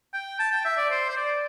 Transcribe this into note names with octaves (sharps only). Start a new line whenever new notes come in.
G5
A5
G5
E5
D5
C5
C5
D5